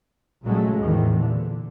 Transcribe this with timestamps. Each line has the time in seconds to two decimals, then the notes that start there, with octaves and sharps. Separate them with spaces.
0.43 A#2 C#3 F#3 G#3 A3
0.79 E2 A2 C3 D#3 E3
1.17 A#2 D3